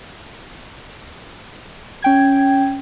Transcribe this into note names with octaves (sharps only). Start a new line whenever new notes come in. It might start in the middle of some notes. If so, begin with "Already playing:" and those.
C#4 G5 G#6